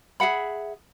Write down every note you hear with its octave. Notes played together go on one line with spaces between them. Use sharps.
G#4 E5 F#5 B5